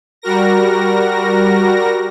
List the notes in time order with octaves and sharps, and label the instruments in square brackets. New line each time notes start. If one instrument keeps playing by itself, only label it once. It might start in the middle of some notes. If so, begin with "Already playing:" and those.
[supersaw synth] G3 F#4 A#4 A#6